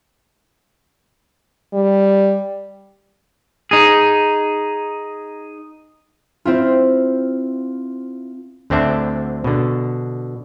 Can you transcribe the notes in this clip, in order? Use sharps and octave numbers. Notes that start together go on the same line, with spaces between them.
G3
D#4 G#4
C4 E4 F4
D2 D3 C4 D4 E5
B2 D3